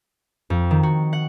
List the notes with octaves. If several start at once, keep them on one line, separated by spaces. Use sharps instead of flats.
F2
D#3
F#4
F#5